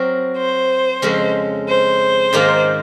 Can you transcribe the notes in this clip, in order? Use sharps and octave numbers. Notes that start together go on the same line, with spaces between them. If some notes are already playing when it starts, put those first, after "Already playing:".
Already playing: F#3 C4 F#4 A#4
C5
F2 C#3 G#3 C#4
C5
G#2 D#3 A#3 F4 G#4